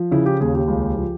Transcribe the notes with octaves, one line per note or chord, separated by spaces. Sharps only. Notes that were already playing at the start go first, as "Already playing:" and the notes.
Already playing: F3
C#3 E4
G4
D#2 G#4
G4
C#2
F3